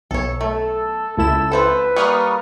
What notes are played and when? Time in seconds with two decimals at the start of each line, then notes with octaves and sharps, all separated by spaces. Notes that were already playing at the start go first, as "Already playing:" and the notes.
0.11 B1 A4 C#5
0.41 A3 A4
1.17 C#2 E4 A4 E7
1.52 F3 C4 A4 B4
1.96 G3 A#3 C#6 D#6 F6